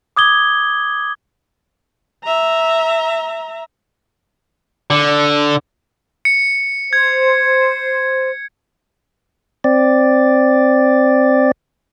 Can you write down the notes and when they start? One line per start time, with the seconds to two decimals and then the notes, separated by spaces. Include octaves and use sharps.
0.17 D6 D#6 G#6 G7
2.24 E5 A#5
4.90 D3
6.25 C#7
6.93 C5 G#6
9.64 C4 D5